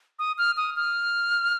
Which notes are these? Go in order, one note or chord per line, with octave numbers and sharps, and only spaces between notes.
D#6
F6
D#6
F6